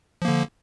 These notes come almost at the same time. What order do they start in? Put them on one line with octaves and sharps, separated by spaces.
F3 A#3 D3